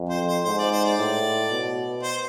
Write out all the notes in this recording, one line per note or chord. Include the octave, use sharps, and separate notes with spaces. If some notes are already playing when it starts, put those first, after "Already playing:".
Already playing: F2
C5
C5
G#2 C5
D5
C5
D5
A2
B2
C5